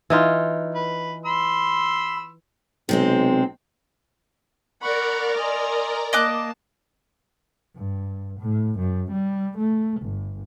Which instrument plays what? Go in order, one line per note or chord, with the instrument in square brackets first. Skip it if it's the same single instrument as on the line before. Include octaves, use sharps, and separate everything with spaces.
[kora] E3 D#4 F4
[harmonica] B4
B5 C6 E6
[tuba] B1 [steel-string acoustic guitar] C3 G#3 C4
[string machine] A#4 D5 A#5 [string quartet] F#5 B5 C#6
[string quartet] D#5 G#5 C6
[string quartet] A#3 A5 [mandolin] D#5 D6 F#6
[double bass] G2
A2
F#2
G3
A3
G1